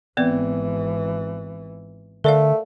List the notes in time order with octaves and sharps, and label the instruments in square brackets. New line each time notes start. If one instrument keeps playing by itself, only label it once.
[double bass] G#1 E3 [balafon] B3 C4 D5
[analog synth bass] D3 [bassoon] A3 [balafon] A#4 D5 F5